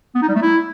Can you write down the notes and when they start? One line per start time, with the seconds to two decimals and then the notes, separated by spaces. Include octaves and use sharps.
0.15 B3
0.22 D#4
0.29 G3
0.35 A3
0.42 E4